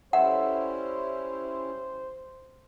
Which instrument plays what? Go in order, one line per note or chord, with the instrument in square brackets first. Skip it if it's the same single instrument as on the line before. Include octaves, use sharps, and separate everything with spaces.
[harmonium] G3 C#4 E4 [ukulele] A4 C#5 E5 [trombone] C5 [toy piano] F#5